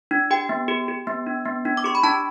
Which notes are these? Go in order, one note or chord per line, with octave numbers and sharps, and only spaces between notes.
D4
G4 G5
B3
G4
G4
B3
D4
B3
D4
D6
G4 C#6
B5
D4 A5